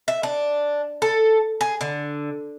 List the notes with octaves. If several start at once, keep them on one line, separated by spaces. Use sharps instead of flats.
E5
D4
A4
G#4
D3